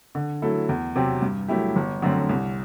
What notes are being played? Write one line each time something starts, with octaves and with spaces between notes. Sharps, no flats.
D3
F#3 A3 E4 A4
E2
C3 F#3 C4 G4
G2
F#3 A3 E4 G4
G1
F#2 D3 A3 C4
C2